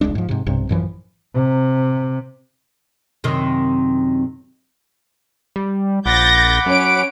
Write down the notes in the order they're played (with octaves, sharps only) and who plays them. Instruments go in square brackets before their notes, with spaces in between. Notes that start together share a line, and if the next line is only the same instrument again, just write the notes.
[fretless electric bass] E1 C2 G#3 D4
G#2 F3
G#2 C3
B1 G2 C3
A1 F#2 E3 F3
[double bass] C3
[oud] F#2 C3 D#3
[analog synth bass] G3
[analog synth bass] A#1 [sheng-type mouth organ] F#5 B5 D6 [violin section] G6 A6 A#6
[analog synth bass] F#2 [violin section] C#4 D7